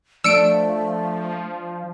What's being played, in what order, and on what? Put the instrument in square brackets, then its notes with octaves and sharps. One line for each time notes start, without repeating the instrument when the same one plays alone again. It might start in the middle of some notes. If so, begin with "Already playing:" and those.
[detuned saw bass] F3 [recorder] A3 [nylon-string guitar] D4 [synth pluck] E6 C#7 D7